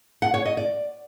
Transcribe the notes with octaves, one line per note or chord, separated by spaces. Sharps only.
F#5
C#5
D#5
D5